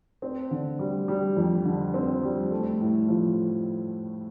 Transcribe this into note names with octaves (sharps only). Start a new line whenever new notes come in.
C4
D3
G3
G3
F2
D3
C4
G3
A3
A2
F3